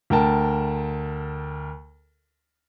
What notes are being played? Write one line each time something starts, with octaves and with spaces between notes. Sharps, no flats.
D2 A#4 G5 A5